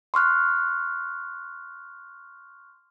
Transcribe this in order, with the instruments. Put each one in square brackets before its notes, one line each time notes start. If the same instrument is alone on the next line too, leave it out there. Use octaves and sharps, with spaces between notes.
[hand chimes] C6 C#6 F6 F#6